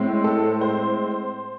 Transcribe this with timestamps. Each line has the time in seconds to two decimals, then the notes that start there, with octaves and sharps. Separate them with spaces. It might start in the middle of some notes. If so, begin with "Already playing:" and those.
Already playing: A2 G#3 C4
0.24 A4
0.61 C5